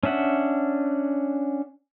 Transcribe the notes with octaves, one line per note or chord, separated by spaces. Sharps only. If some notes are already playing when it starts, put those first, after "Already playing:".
C#4 D4 E5 F#5